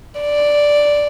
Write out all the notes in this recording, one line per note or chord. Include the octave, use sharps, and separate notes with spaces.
D5